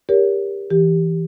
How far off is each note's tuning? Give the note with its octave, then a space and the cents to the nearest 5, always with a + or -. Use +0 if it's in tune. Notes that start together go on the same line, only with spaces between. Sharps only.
G4 +20 A#4 +15 C#5 +35
E3 +0 G4 +0